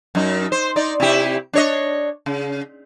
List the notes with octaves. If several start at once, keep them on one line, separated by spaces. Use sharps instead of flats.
F#2 D#4
C5
D#4 D5
C3 E4 G4
D4 C#5 D#5
C#3